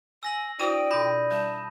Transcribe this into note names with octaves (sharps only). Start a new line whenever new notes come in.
G#5 E6 A#6 F#7
D4 E4 F#4 C5 G5 D#6 D#7
B2 F4 B5 G6 A#6
G3 A5